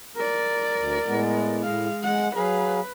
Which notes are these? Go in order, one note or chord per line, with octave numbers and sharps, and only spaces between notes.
A#4 D5
D2
A2 G#3 B3
A2 G#3 F5
G#3 F#5
F#3 G#4 B4 F5